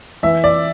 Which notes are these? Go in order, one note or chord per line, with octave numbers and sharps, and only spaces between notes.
E3 E5
D5